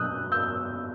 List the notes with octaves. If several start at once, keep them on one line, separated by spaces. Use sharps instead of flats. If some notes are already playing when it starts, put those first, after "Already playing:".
Already playing: B2 F#3 D#6 E6 F#6 G6
E6 G6